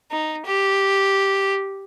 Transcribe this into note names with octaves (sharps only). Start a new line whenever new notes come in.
D#4
G4